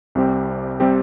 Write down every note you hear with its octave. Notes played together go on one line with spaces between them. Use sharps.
C2 C3 G3 C4 G4
C3 G3 C4 G4